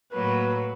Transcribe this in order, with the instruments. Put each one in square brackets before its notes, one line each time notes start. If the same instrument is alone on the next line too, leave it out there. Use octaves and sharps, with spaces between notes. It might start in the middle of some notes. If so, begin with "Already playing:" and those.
[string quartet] A2 F#3 A#3 [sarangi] B4